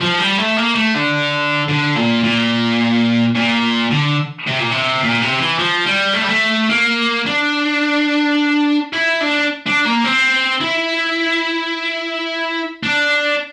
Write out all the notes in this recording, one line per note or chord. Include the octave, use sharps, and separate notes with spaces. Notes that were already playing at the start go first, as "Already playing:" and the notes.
F3
G3
A3
A#3
A3
D3
D3
A#2
A#2
A#2
D3
C3
A#2
C3
A#2
C3
E3
F3
G3
A3
G3
A3
A#3
D4
E4
D4
D4
A#3
C4
E4
D4